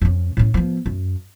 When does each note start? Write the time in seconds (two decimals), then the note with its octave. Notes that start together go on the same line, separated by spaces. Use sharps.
0.01 F2 C#4
0.37 A2 C#4
0.54 F3 B3
0.86 F#2